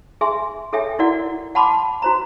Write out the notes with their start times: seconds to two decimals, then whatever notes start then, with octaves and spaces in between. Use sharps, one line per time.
0.21 G#4 E5 G#5 C6
0.73 G#4 A4 C#5 E5 G5 G#5
0.99 E4 F#4 A#4 D5 F#5
1.55 F#5 A5 B5 C6 D6
2.02 F#4 C5 A#5